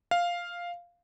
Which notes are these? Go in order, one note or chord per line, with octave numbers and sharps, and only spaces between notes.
F5